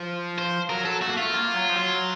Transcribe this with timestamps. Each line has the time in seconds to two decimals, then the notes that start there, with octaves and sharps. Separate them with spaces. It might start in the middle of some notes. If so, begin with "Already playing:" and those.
Already playing: F3
0.38 C5
0.70 F#3 A#4
0.85 A4
1.02 A3 F#4
1.09 A#3
1.16 A3 F4
1.33 A#3
1.54 F#3
1.70 F3
1.75 F#3